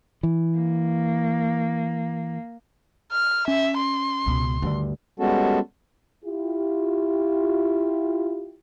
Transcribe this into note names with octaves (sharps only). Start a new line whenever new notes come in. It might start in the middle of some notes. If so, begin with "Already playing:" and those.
E3
A#3
F6
C#4 E5
C6
C#2 B2
D2 G2 D3 D#3
G3 G#3 B3 C#4 F#4 A4
E4 F4 G4